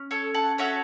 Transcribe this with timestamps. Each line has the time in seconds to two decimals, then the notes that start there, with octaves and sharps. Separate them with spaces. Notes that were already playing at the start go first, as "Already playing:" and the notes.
Already playing: C#4
0.11 A4 C#5
0.34 F#5 A5
0.58 C#4 F#4 A4 C#5 E5